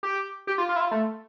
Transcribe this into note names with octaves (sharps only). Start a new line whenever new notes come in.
G4
G4
F4
F4
E4
F4
A3